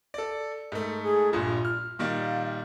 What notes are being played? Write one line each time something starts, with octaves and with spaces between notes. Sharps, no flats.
A4 D5
G#2 A3 A4
G#4
A#1 G2 F4
F6
A#2 D#3 G3 F5